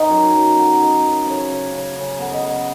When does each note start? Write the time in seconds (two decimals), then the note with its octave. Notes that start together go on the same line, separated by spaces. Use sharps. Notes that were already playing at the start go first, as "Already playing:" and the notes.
Already playing: D#3 D#5
0.09 F#2
0.32 F#2
0.56 B3
0.79 D#3
1.03 F#2
1.25 C#3 C#5
1.49 C#3
1.73 C#3
1.96 C#3
2.19 B3
2.30 D#5
2.42 B3